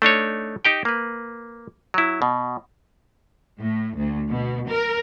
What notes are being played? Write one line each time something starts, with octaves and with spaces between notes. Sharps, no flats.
A3 D4 D#4 C#5
D#4 G4 G5
A#3 B4
F#3 E4
B2
A2
D2
B2
A#4